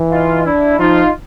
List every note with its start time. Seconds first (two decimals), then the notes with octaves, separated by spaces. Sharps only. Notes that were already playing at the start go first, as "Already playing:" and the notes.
Already playing: E3
0.12 D#4 F4
0.45 D4 E4
0.79 F3 D#4 F4